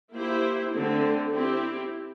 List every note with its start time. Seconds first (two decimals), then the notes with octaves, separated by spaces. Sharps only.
0.14 A#3 E4 G4 C5
0.72 D3 A3 C4
1.31 C4 E4 G4